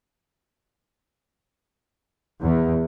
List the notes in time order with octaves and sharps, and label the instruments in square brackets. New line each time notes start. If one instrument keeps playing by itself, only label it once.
[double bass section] E2